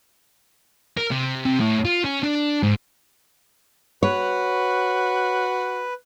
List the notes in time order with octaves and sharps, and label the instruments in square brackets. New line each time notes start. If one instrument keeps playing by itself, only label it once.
[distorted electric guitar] A#4
C3
C3
A2
F4
C#4
D4
G#2
[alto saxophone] F#4 [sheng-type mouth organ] B4 [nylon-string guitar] C#5